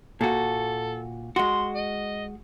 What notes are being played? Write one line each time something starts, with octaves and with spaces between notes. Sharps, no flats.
A#2 F#4 A4
G#3 F#4 C6
D#5